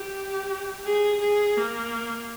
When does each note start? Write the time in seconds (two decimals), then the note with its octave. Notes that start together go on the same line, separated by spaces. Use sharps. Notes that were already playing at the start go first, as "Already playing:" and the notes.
Already playing: G4
0.85 G#4
1.21 G#4
1.57 A#3